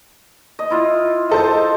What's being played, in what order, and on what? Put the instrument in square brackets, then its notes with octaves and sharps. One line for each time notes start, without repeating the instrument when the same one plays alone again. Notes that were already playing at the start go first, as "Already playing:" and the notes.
[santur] D#5
E4 F4
[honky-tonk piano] D#4 A4 C5 [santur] D#5